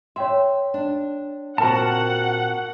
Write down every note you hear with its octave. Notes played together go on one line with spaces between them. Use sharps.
C#5 E5 G5 C6
D4
A#2 C4 F#4 A#4 F#5 A5